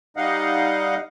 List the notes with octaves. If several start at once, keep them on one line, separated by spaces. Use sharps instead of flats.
G3 D#4 D#5 F5 F#5